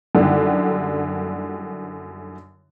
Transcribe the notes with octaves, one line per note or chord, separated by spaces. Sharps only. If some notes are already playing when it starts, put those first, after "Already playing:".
F#2 D3 D#3 G3 A#3 E4